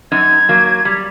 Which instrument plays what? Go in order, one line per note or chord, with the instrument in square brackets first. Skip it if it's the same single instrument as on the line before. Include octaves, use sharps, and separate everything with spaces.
[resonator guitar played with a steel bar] F#2 D#4 [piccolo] G#6
[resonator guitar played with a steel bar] F#3 A#3
G3